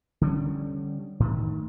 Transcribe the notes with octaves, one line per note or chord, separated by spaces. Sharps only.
D3 G3 C#4
A2 D#3